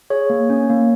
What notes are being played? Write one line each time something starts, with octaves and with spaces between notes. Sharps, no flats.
G#4 C#5
A#3
C#4
A#3